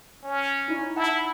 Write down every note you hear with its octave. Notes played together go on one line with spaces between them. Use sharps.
C#4
D#4 E4 D5
E4 F#5 A5